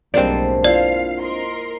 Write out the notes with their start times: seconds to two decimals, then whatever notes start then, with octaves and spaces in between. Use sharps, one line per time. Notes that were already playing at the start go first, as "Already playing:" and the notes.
0.14 B1 F#2 A2 G3 G#3 A#3 C4 D4
0.64 E4 F4 C5 D5 F5
1.21 A#4 D#5 C6